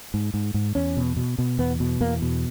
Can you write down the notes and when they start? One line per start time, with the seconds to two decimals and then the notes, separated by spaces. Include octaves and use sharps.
0.14 G#2
0.34 G#2
0.54 G#2
0.75 E2 C#4
0.97 B2
1.17 B2
1.38 B2
1.58 E2 B3
1.80 B2
2.00 E2 A#3
2.22 B2